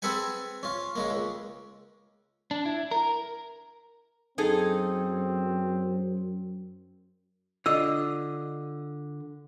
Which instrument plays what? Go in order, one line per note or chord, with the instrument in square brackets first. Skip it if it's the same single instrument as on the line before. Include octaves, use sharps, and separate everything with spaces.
[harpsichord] C4 G#4 A4 B4 F#5 G#5
C#4 F4
C#3 G#3 A#3
C#2
[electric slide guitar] D4
E4
A#4
[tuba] F#2 [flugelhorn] C4 [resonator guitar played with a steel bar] D#4 G#4 A4
[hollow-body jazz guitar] D3 F4 D#5 [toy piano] E6